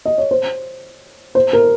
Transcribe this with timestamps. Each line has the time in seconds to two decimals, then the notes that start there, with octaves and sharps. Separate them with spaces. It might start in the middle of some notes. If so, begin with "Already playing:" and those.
0.05 D#5
0.18 C#5
0.31 C5
1.35 C5
1.53 A#4